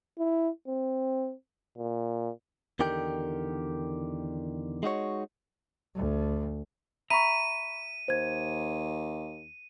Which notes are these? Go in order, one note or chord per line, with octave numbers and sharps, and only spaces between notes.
E4
C4
A#2
E2 D3 D#3 G4 A#4 G5
G#3 D#4 F#4 C#5
D2
E5 A#5 B5 C#6 D#7
D#2 C5 G#6